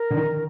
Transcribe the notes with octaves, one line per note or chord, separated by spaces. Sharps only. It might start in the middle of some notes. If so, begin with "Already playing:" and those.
Already playing: A#4
D3
D#3